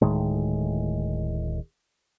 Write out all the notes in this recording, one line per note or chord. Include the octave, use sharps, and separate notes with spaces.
D1 A2 D#3 G#3